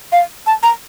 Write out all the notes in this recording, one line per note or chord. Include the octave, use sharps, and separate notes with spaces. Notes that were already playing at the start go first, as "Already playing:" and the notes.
F5
A5
A#5